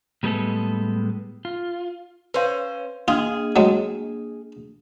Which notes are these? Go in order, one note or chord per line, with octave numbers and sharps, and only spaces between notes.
A2 G3 G#3 B3 A4
F4
C#4 B4 C5 F5
A#3 D4 F4 G#4 F6
F#3 G#3